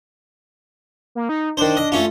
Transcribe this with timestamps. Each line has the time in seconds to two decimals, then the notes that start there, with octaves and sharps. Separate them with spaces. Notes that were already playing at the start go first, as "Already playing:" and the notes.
1.15 A#3
1.29 D#4
1.57 D#3 D4 C5
1.77 D#5
1.92 A3 C#4 F4